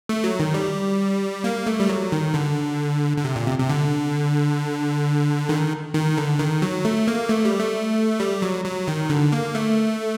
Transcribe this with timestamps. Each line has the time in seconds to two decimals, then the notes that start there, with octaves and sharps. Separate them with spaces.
0.09 A3
0.24 F#3
0.40 D#3
0.54 G3
1.44 A#3
1.67 A3
1.80 G3
1.89 F#3
2.12 D#3
2.34 D3
3.17 D3
3.24 C3
3.36 A#2
3.47 C3
3.59 C3
3.69 D3
5.49 D#3
5.94 D#3
6.17 D3
6.39 D#3
6.62 F#3
6.85 A3
7.07 A#3
7.29 A3
7.45 G3
7.60 A3
8.20 G3
8.42 F#3
8.65 F#3
8.88 D#3
9.10 D3
9.32 A#3
9.55 A3